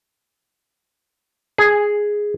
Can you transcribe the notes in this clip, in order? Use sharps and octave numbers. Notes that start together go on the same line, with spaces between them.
G#4